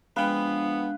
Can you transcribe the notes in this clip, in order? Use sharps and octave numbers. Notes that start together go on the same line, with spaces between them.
F3 G#3 B3 D4 B4 F5 G5